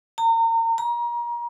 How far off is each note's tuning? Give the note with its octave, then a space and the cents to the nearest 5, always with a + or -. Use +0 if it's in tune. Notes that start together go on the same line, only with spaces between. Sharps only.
A#5 -35
A#5 +30